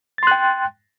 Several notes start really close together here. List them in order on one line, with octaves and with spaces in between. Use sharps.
A6 C6 F#6 G5